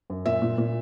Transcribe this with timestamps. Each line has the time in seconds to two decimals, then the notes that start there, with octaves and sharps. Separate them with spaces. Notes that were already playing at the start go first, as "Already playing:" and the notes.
0.10 F#2
0.26 A#2 E5
0.42 A#2
0.58 A#2